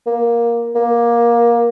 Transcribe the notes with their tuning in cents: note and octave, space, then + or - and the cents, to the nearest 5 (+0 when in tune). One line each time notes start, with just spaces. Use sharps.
A#3 +10
A#3 +15